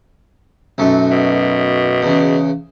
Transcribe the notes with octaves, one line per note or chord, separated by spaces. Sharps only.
B1 F#2 A3
B2
E2 C#3